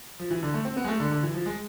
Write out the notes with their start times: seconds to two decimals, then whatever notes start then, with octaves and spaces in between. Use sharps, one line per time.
0.19 F3
0.31 E3
0.43 D3
0.54 A3
0.65 C4
0.77 B3
0.84 G#3
0.88 A3
1.00 D3
1.11 D3
1.23 E3
1.34 F3
1.46 G#3